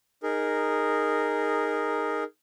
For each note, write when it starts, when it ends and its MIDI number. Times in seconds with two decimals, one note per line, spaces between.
0.23 2.24 63
0.23 2.24 68
0.23 2.24 70